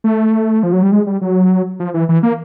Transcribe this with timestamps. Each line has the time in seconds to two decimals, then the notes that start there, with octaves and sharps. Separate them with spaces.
0.04 A3
0.63 F3
0.73 F#3
0.83 G3
0.92 G#3
1.07 G3
1.21 F#3
1.80 F3
1.94 E3
2.09 E3
2.23 A#3